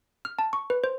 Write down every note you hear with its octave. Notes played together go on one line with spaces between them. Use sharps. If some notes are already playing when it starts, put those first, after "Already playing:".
F6
A5
C#6
B4
C5